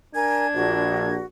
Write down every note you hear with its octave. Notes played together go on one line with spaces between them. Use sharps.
D4 A#4 G#5 G#6
A#1 F#4